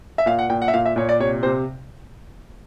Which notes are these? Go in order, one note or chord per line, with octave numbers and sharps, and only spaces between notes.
E5
A#2 F5
F#5
A#2 G5
F#5
E5
A#2 F5
E5
A#2 C#5
D5
C3 C#5
C3 C5